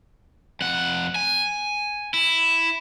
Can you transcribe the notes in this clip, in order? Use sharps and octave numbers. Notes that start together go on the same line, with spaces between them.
F2 F#5
G#5
E4